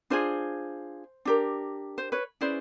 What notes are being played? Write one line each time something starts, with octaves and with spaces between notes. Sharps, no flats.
D4 F4 G#4 C5
D4 G4 A#4
C5
B4 C#5
C#4 E4 G#4 B4 C5 D5